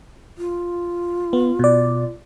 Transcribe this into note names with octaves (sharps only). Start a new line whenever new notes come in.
F4
B3
B2 D5